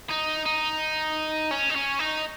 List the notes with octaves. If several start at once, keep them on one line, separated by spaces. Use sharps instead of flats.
D#4
D#4
C#4
D#4
C#4
D#4